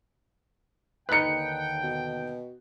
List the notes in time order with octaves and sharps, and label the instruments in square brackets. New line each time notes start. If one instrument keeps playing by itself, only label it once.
[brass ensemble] D#2 D3 G5 [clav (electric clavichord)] D#4 B4 [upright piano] F#6 C#7
[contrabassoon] B2